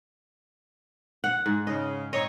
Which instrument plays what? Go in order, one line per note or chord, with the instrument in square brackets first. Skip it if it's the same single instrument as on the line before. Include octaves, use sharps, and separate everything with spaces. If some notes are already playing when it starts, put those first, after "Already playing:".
[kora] F#5
G#2
[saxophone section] C#3 [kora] D#5
[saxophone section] C4 D#4 C#5 [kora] D#5